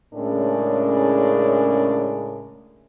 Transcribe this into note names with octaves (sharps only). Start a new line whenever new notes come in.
A2 C#3 G#3 C#4 D4 A#4